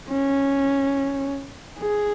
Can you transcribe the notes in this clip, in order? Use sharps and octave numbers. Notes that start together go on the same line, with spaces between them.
C#4
G#4